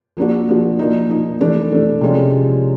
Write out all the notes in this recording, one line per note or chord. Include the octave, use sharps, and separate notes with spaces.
F3 A#3 D4 F#4
F3 A#3 D4 F#4
F3 A#3 D#4
F3 A#3 D#4
E3 A3 D4
E3 A3 D4
C3 F3 G#3 C#4 F4